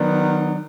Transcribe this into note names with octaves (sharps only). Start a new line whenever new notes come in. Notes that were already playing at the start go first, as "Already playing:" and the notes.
Already playing: D#3 F#3 B3 D4